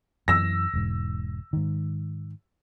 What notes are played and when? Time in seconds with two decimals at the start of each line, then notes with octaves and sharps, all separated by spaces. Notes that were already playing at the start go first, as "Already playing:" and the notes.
0.28 F#2 E3 E6 A#6
0.73 E1 G#2
1.53 G#2 D#3